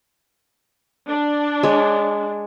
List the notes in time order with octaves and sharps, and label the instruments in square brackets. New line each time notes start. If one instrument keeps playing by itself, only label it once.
[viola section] D4
[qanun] G#3 C#5